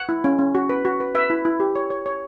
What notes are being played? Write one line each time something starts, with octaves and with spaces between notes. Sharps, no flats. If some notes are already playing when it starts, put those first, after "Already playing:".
Already playing: F#5
E4
C#4
C#4
F#4
B4
F#4
B4
B4 E5
E4
E4
G4
C#5
C#5
C#5